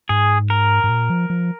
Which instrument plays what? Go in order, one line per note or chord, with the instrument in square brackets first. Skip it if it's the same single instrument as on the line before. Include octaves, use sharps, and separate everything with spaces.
[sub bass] G#2 [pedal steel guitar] G#4
[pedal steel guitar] A#4
[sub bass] G#2
A#2
F3
F3